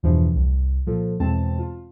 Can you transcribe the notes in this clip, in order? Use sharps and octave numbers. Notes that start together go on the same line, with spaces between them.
E2 G2 B2 E3 F3
C2
A#2 F3 A4
E2 B2 G#3 C4 A5
F4